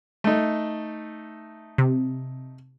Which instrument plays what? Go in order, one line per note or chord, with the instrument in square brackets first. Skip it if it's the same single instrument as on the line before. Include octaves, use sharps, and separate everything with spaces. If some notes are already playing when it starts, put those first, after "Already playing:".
[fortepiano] A3 D#4
[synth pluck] C3